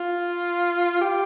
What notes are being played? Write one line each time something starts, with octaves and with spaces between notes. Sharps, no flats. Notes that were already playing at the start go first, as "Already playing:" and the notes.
Already playing: F4
G4